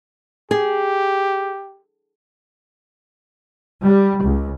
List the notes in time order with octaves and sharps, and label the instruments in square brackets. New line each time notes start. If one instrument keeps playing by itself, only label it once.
[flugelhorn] G4 [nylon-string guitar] G#4
[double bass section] G3
C#2